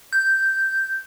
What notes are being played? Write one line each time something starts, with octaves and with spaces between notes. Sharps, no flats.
G6